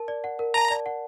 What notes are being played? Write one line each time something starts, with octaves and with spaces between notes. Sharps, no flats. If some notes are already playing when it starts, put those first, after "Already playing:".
Already playing: A#4 A5
D5
F#5
A#4
A5 A#5
D5
F#5